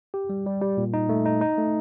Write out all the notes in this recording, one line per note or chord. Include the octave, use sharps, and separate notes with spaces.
G4
G3
G3
G3
A#2
D#4
A3
D#4
D#4
A3